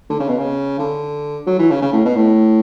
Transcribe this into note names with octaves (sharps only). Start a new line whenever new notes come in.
D3
C#3
B2
C#3
D3
F#3
E3
C#3
C#3
A2
B2
A2